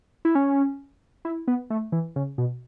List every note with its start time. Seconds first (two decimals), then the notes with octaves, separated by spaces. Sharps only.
0.25 E4
0.35 C#4
1.25 E4
1.48 B3
1.70 A3
1.92 E3
2.16 C#3
2.38 B2